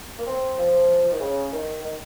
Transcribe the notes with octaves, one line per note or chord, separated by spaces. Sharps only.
A#3
C4
F3
D#3
C#3
D#3
D#3